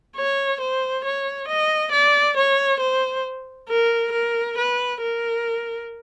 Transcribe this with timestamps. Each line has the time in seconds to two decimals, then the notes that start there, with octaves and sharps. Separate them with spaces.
0.16 C#5
0.60 C5
1.04 C#5
1.48 D#5
1.92 D5
2.37 C#5
2.80 C5
3.69 A#4
4.12 A#4
4.58 B4
5.01 A#4